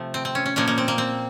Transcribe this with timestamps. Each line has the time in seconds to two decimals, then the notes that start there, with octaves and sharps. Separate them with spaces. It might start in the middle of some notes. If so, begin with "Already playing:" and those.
Already playing: C3 F3 A3
0.14 C4
0.25 C4
0.35 C#4
0.46 C#4
0.56 A#2 F3 A#3 C#4
0.68 A#3
0.78 C4
0.88 A#3
0.98 C4